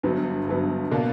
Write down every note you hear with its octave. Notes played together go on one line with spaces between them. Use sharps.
G1 G2 F#3 B3
G1 G2 F#3 B3
B2 A#3 D4